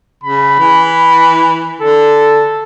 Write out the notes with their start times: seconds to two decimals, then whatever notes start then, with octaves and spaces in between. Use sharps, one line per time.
0.24 C#3 B5
0.59 E3
1.81 D3 A4